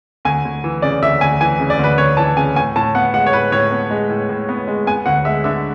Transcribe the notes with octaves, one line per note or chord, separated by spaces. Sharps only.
D2 G#5
D2
E3
C#3 D5
D2 E5
D2 G#5
E3 G#5
C#3
D5
D2 B4
D2 C#5
E3 A5
C#3 G#5
A2 G#5
A2 A5
B3 F#5
G#3 F#5
C#5
A2 B4
A2 C#5
B3
G#3
A2
A2
B3
G#3
B3 G#5
D2 F#5
G#3 E5
D3 E5